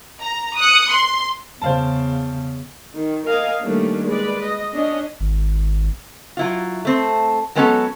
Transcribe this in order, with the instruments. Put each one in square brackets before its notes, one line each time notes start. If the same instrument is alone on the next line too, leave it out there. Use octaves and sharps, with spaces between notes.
[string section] A#5
D#6 F#6 C#7
C6
[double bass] E2 C#3 [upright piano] C5 F5 A5
[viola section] D#3
A#4 D#5 F5 G#5
D#3 G3 A3 A#3 C#4 D4
G#3 B4 D5
D#5
C#4 D4 D#5
[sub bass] G#1
[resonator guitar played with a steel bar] F#3 E4 F4
A3 C4
F#3 G#3 B3 C#4 F4 A4